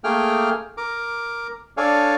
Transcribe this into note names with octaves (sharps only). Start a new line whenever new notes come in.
A3 A#3 G#4 G5 F6
A#4 D6
D4 A4 C#5 D5 F5 G#5